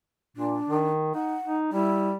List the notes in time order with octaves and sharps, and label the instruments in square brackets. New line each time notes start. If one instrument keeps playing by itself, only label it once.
[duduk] A#2 [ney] D4
[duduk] D#3
[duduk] D#4 [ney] F#5
[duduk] D#4
[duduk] G3 [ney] E4